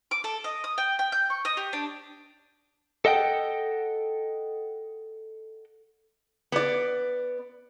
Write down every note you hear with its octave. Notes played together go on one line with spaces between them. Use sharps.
D6
A4
D#5
D#6
G5
G5
G6
C#6
D#5
G4
D4
A4 D#5 F#5 G5
B3 D5